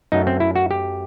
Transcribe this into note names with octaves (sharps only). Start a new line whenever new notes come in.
F#2 F#3 A3 D#4
C4
E4
F#4
G4